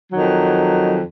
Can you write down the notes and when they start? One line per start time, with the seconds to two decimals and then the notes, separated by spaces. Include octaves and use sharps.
0.12 F2 D#3 F#3